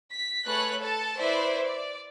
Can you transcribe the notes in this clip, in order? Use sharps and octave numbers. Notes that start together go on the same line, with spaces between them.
B6
A3 G#4 B4 C#5 F#6
A4 A5
E4 B4 C5 D5 E5
D5